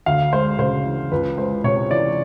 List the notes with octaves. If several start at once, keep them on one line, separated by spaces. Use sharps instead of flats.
D2 F5
G#3 C5
C#3 C5
E3
C#2 B4
G#3 C5
C3 C#5
E3 D5